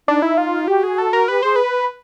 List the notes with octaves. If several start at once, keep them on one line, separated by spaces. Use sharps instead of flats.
D4 D#4
E4
F4
F#4 G4
G#4
A4
A#4
G4 B4
G#4 C5
B4